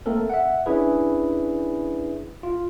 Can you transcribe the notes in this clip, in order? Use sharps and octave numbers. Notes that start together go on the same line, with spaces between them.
A3 A#3 C4 A4 A#4
E5 F#5
C#4 D4 E4 G#4 B4
F4